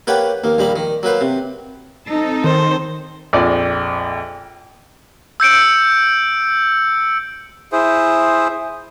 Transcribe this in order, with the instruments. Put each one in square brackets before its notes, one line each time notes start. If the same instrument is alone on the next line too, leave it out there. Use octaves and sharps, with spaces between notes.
[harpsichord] A#3 G4 B4 C#5 F#5 G5
D#2 A#3
A#1 D#2 G3 A#3 B5
D#3
F#3 A#3 B4 C5
C3
[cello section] C4 D#4 A4
[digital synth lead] D#3 [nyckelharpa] C5
[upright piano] A#1 F2 D5
[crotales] E6 G6 C#7 D7
[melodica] E4 G#4 C5